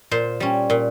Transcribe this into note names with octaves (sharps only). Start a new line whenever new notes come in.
A#2 C5
G3 C#4
A#2